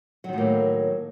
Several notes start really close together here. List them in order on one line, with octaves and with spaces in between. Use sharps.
F#3 D#3 A2 A#3